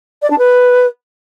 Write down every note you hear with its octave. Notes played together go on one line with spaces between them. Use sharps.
D5
D4
B4